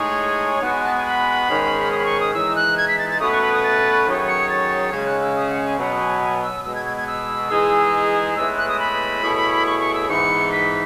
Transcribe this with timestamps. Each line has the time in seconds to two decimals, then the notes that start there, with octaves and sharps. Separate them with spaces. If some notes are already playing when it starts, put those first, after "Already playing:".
Already playing: A2 G#3 D#4 G#4 C#5
0.19 G#5
0.62 G#3 B3 D#4 F#4 B4 F#5
0.73 G#5
0.83 A5
0.95 G#5
1.06 B5
1.48 G#2 D#3 G#3 C#4 G#4
1.91 D#6
1.98 B5
2.05 C#6
2.20 D#6
2.34 E3 G#3 D#4 E6
2.56 F#6
2.77 G#6
2.88 B6
2.99 A6
3.10 A6
3.20 B2 A3 C#4 F#4 B4 D#6
3.32 C#6
3.41 B5
3.52 D#6
3.63 A6
4.06 D#3 F#3 C#4 G#4 C#5
4.28 C#7
4.49 A6
4.92 C#3 G#3 C#4 G#6
5.07 F#6
5.21 E6
5.36 D#6
5.50 F#5
5.64 G#5
5.78 B2 F#3 B3 F#5
6.00 G#5
6.21 G#5
6.42 E6
6.64 B2 G#3 B3 E6
6.75 G#6
6.85 G#6
6.97 G#6
7.07 E6
7.50 E3 G#3 D#4 G#4
8.36 A2 G#3 B3 E4 B4 E6
8.58 F#6
8.68 D#6
8.80 B5
9.23 B2 A3 E4 G#4 C#5
9.66 C#6
9.80 C#6
9.94 E6
10.09 G#2 E3 B3 C#7
10.52 B6